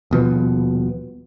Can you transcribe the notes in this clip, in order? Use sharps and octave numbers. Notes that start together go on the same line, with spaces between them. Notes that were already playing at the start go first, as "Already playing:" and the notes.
D#1 B2 F3 B3